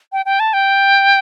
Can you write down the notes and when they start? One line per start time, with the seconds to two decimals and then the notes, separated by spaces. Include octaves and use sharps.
0.12 G5
0.25 G5
0.40 A5
0.53 G5